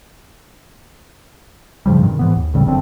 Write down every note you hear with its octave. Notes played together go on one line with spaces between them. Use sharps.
G2 C#3 F3 G3
G2 C3 D#3
G#2 E3 B3
D#2
A1 C#3 G3 C4
F1 F#2 D3 C4